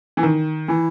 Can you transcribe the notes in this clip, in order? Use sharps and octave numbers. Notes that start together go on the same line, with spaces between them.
E3
D#3
E3 E4